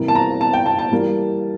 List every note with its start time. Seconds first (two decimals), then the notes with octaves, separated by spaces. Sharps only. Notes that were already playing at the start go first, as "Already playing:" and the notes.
Already playing: C3 E3 G3 A#3
0.08 A5
0.15 A#5
0.41 A5
0.53 G5
0.66 A5
0.79 A5
0.92 E3 G3 A#3